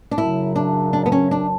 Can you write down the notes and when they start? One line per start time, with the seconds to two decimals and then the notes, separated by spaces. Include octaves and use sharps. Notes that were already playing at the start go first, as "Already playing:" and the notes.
0.11 D4
0.18 F#2 C#3 F#3 E4
0.56 D4
0.93 D4
1.06 B3
1.12 C#4
1.31 D4